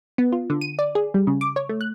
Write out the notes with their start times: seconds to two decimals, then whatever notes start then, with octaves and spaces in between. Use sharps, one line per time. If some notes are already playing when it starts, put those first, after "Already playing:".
0.18 B3
0.32 F4
0.50 D3
0.61 D#7
0.79 D5
0.95 G#4
1.14 G3
1.27 C#3
1.41 D6
1.56 C#5
1.69 A3
1.81 F#6